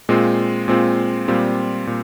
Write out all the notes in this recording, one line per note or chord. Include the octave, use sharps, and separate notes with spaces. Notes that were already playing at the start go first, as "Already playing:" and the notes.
A#2 G#3 C4 F4
A#2 G#3 C4 F4
A#2 G3 C4 F4
A#2